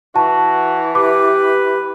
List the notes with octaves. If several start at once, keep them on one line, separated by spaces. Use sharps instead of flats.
E3 F#4 A5
G4 B4 D6